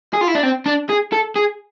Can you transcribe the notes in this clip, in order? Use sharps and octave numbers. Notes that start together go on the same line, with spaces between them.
G#4
F4
E4
D4
C4
D4
G#4
A4
G#4